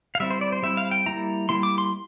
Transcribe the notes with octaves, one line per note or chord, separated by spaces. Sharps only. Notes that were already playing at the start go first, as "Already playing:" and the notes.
F5
G3 C4 E4 E5
C5
D5
C5
G3 C4 E4 E5
F5
G5
G3 A#3 E4 A#5
G3 A#3 E4 C6
D6
C6